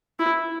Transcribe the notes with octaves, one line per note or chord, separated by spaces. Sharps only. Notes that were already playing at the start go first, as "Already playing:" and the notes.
E4